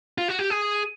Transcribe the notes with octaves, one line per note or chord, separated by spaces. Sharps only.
F4
F#4
G4
G#4